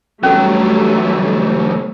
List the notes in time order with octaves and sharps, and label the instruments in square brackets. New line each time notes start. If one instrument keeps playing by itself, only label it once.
[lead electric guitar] E2 F#3 [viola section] G3 A3 [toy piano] C#4 A4